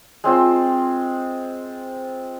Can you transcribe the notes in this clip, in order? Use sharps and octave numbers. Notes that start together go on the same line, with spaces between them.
G#3 C4 F4 C5